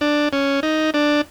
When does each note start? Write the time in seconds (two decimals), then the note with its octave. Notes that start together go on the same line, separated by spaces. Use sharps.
0.01 D4
0.33 C#4
0.63 D#4
0.94 D4